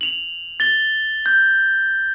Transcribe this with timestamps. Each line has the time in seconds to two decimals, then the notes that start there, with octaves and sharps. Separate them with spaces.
0.01 F7 F#7
0.60 A6 G7
1.26 G6